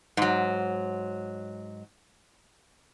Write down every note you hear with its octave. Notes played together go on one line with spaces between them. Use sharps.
G#2 F#3